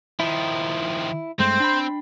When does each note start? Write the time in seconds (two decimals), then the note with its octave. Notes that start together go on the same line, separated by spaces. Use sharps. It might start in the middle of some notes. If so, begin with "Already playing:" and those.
0.20 D#3 F3 E4
1.39 G2 G#3 A3 C4 C5
1.60 D4 G5 B5